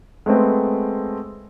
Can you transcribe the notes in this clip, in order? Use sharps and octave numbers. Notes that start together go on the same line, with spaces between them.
G#3 A3 B3 C4